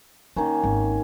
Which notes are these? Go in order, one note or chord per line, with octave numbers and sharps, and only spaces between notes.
D#3 A#3 C#4 D#4
G#1